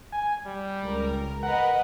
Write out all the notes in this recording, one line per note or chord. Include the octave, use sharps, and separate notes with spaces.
G#5
G3
C#2 A#4
A#4 B4 D#5 F#5